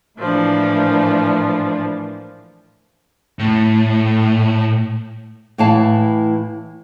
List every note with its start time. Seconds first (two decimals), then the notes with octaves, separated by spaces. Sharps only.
0.18 A2 E3 F3 A#3 D4
3.39 A2
5.58 A2 E3 E4 F5 A5